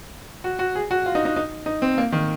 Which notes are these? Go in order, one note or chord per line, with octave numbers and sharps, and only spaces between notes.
F#4
F#4
G#4
F#4
F4
D#4
D#4
D#4
D#4
C4
A#3
D#3